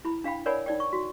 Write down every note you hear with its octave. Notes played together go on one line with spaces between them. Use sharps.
E4 B5
D4 F5 G5 B5
A#4 C#5 D5 F#5 G#5 B5
D#4 D5 G5
C#6
F#4